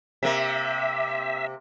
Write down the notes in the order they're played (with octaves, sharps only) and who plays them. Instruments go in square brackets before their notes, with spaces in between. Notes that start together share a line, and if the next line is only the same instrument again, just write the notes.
[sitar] C3 A#3 [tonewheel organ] E5